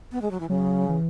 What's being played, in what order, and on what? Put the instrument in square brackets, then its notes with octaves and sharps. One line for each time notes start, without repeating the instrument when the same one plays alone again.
[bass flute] B3
G#3
F#3
E3
[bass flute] C#3 [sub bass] F#3
[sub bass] E3